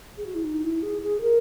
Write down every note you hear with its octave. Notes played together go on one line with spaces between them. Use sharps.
G#4
F#4
E4
D#4
E4
G#4
G#4
A#4